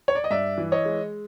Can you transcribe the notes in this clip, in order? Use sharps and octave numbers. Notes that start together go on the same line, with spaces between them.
C#5
D5
D#5
G2 D5 E5
E3
C#5 D#5
G#3